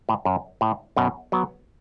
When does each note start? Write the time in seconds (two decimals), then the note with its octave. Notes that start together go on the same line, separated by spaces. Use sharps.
0.09 A2
0.25 F#2
0.61 A2
0.97 F#2 B2
1.32 F#3 B3